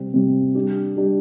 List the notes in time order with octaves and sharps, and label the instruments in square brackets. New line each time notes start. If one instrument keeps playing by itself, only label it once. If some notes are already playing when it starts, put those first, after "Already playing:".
Already playing: [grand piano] C3 G3 C4
C3 G3 C4
G3 D4 G4
G3 D4 G4